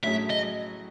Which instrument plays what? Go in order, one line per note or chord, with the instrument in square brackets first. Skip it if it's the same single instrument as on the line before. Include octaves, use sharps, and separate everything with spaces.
[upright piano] A2 F#3 A3 C#4 G#4 [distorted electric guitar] E5
[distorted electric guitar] D#5